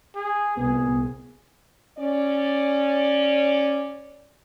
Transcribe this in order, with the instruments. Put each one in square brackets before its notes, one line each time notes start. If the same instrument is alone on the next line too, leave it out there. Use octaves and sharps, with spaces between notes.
[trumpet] G#4
[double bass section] C2 A#2 [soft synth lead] B3 [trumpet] G#4
[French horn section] C#4 D5